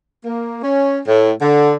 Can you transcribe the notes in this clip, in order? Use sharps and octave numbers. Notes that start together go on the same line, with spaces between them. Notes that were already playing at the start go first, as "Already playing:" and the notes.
A#3
C#4
A2
D3